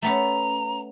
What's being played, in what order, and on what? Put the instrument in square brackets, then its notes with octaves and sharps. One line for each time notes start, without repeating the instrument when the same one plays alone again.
[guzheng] A3 B3 C#4 [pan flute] A#5